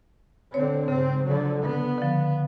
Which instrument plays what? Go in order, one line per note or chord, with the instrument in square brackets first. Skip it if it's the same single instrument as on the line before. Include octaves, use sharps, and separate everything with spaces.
[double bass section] D3 C4 [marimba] C#5
[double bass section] G#2 C4 [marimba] C#3
[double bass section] D3 F3 F#3
B3
[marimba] D3 F3